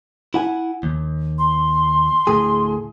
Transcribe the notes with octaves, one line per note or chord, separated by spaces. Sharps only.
E4 F#5 G#5
D#2
C6
D2 A2 G#4